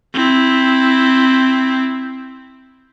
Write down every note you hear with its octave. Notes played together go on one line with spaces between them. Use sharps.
C4 E4